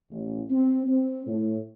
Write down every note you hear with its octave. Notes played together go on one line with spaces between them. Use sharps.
A1
C4
C4
A2